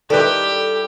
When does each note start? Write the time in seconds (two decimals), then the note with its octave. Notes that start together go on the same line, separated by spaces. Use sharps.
0.10 D#3 G3 E4 G4 A4 B4 F#6